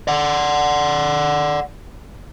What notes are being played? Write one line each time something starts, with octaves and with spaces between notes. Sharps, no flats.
D5 F#5